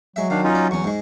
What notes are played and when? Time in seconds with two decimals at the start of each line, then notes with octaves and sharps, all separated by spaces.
0.16 F#3 G#3 E5
0.30 D#3 D4 F5
0.44 C#4 D#4 F4
0.55 D5
0.71 E2 C#4 C#6
0.84 G#2 G#3